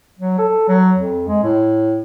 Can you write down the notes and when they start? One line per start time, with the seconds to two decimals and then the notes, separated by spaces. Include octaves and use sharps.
0.19 F#3
0.38 A4
0.68 F#3
0.98 F2
1.27 G#3
1.43 A2